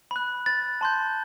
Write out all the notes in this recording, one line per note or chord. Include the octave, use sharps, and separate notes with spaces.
B5 F#6
A6
A5 C6 G6